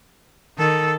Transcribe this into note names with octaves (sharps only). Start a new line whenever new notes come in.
D#3 A4